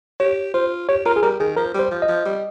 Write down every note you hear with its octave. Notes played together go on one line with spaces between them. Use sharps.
G4 C#5
F4 C5
G4 C#5
F4 A#4
G#4
G3 A#4
D#3 G#4
F3 A#4
G3
C5
F3
D#5
F3
G3